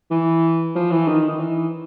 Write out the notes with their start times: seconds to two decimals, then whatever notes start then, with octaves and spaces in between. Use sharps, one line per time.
0.11 E3
0.75 F3
0.91 E3
1.08 D#3
1.28 D#3
1.40 E3